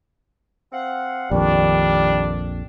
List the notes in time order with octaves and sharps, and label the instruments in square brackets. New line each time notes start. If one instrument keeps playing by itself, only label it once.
[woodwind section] C4 F5 F#5
[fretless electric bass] A#1 F2 [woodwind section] D#3 [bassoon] G3 [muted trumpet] D4